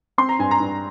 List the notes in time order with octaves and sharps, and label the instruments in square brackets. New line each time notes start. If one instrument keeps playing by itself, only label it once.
[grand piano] C4 C6
A#5
G2 G#5
A#5
G2